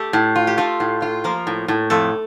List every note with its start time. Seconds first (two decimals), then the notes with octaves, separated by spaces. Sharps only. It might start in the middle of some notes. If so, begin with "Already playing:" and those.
Already playing: A3 G4 A4
0.13 A2
0.36 F4
0.47 G4
0.57 A3 F4 A4
0.80 A2
1.02 F4
1.24 F3 A#3 A#4
1.47 A2
1.68 A2
1.90 F2 A3 A4